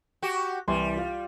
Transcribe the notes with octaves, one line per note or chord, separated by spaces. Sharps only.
F#4 G4
C2 E3 G3 C6
F4